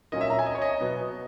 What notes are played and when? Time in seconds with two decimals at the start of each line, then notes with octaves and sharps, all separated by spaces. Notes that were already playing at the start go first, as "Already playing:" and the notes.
0.12 A#2 F#3 A#3 C#4 D#5
0.21 E5
0.30 A#5
0.39 G#5
0.46 D#5
0.55 C#5
0.62 D#5
0.80 B2 F#3 B3